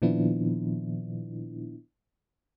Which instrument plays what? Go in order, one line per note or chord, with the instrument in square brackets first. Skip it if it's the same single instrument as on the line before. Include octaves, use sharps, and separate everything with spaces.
[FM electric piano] A#2 D#3 F3 B3 D4 E4